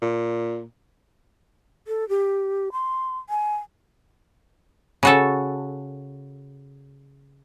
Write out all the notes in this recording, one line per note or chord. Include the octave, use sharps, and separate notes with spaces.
A#2
A4
G4
C6
G#5
C#3 F#4 A4